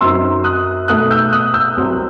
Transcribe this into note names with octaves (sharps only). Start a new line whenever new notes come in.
F#2 F#3 C4 D#4 C6 E6
D#6 F#6
B2 A3 D#4 D#6 F#6
E6 G6
D#6 F#6
E6 G6
C2 C3 F#3 C4